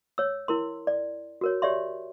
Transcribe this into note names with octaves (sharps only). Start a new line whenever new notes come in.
C#5 E6
E4 A#4 C6
D5
F#4 A#4 C#5
G4 C#5 D5 E5 C6